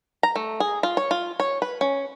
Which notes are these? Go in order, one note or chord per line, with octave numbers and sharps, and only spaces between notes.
A#5
A3
G#4
F4
C#5
F4
C#5
B4
C#4